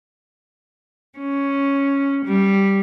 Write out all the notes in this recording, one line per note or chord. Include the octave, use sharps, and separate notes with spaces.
C#4
G3